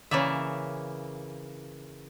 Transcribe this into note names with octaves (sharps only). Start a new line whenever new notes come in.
C#3 E3 A#3 D5 E5